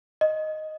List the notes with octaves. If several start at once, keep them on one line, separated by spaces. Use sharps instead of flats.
D#5